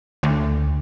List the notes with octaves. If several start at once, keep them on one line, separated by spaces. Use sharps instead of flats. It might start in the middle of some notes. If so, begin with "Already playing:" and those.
D2